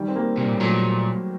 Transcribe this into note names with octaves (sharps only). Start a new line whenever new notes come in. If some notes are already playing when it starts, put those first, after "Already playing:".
Already playing: D#3 G3
C4
G3 A#3
C3 G3 A#3
A#2
A2
A#2 F#3 A3